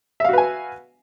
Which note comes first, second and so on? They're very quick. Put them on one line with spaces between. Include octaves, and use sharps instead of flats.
E5 F5 F#4 B4 G#5